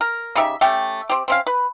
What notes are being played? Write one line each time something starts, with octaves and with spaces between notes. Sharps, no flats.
A#4
C#3 D#4 G4 E5
A3 C#4 G4 G5
C4 G4
C4 C#4 F5
B4